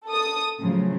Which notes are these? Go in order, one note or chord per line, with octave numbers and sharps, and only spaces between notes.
A4 D#6
A2 C#3 F3 F#3